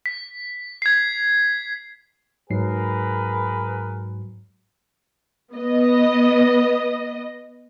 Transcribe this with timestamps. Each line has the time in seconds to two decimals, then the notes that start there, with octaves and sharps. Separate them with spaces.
0.06 B6
0.82 G#6 C7
2.50 G#2 F#3 G#4 A#4 B4 C7
5.54 B3 D#5